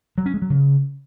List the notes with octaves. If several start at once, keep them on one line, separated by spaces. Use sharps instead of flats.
F#3
C#4
G#3
F#3
C#3